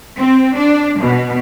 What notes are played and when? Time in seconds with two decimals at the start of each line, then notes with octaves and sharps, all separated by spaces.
0.19 C4
0.57 D4
1.00 B2